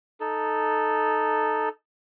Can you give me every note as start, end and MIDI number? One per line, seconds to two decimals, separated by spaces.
0.20 1.69 63
0.20 1.69 69